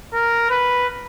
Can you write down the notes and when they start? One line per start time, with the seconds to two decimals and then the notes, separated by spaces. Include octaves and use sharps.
0.13 A#4
0.50 B4